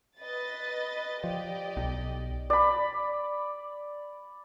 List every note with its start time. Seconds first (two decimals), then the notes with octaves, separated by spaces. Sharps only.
0.19 B4 D#5 A6
1.24 F3 G4 D5 D#5
1.77 B1
2.50 D5 B5